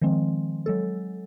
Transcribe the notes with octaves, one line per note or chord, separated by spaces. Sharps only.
D#3 F3 G#3 C4
F#3 G#3 A4